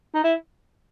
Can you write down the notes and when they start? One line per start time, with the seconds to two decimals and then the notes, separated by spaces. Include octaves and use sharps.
0.14 D#4
0.24 E4